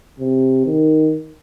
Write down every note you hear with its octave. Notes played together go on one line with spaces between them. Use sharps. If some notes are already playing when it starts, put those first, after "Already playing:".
C3
D#3